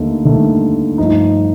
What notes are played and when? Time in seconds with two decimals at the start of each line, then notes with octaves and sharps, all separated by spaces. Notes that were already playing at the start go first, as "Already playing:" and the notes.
Already playing: D#2 D3 A3 D#4
0.25 D#2 D3 A3 D#4
0.98 G2 F3 A3 D#4